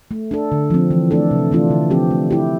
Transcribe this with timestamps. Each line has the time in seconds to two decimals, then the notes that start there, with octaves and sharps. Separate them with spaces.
0.11 A3
0.31 D4 A4
0.52 D3
0.70 F3 C4
0.91 E3
1.11 A3 D4 A4
1.31 C3
1.52 E3 A3 D4 F4
1.70 D3
1.90 F3 C4 G4
2.11 A3
2.30 E4 G4